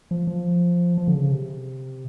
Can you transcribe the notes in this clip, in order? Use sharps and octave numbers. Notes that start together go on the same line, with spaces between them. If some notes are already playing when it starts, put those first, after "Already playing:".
F3
F3
F3
D3
C#3
C3